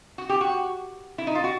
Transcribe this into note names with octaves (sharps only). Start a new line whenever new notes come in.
F#4
G4
F#4
E4
D#4
F4
F#4